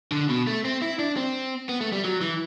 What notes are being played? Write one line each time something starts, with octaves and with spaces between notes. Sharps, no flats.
D3
B2
A3
C4
E4
D4
C4
B3
A3
G3
F#3
E3